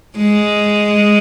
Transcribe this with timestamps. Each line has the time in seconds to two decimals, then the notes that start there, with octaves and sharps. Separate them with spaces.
0.18 G#3